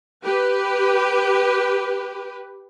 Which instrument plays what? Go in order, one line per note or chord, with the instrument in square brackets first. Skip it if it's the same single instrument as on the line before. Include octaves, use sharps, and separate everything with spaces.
[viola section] G4 B4